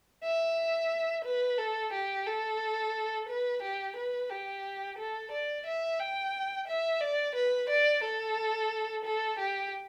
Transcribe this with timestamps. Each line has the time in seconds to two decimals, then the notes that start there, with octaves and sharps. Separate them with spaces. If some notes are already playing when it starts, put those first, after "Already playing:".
0.24 E5
1.24 B4
1.58 A4
1.93 G4
2.26 A4
3.29 B4
3.63 G4
3.96 B4
4.30 G4
4.98 A4
5.32 D5
5.66 E5
5.99 G5
6.68 E5
7.01 D5
7.35 B4
7.69 D5
8.04 A4
9.05 A4
9.39 G4